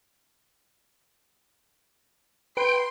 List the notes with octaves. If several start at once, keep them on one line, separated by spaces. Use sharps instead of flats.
B4 G5 C6